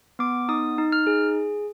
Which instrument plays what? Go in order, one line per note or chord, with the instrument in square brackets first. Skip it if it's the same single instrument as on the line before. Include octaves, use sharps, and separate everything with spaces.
[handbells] B3 D6
D#4 D#6
D#4
F6
G#4